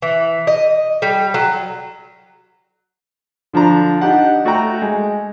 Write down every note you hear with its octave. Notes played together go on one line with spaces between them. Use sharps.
E3
D#5
G3
F#3
D3 F3 D4 A#5
D4 D#4 G4 F#5
A3 F#4 A4 G5 A#5
G#3